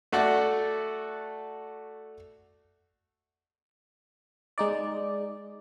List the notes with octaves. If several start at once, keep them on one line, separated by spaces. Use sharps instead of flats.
A3 F#4 A4 D5 F#5
G#3 D#4 D5